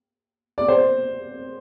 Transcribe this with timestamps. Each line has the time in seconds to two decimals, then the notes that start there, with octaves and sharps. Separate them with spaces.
0.58 D5
0.68 C5